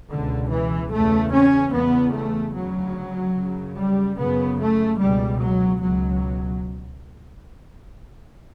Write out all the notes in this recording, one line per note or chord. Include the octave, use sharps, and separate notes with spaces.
C#2 B2 D3
E3
E2 C#3 A3
C#4
E2 C#3 B3
A3
D2 C#3 F#3
F#2 C#3
G3
F#2 C#3 B3
A3
C#2 B2 G3
F#3
C#2 B2 F#3